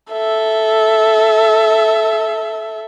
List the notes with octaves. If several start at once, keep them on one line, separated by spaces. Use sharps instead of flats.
A4 E5